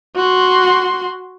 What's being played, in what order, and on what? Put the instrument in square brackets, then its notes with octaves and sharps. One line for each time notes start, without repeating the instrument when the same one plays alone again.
[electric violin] F#4 C6